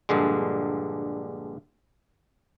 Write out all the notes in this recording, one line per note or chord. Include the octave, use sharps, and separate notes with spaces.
A#1 G2 D3 G#3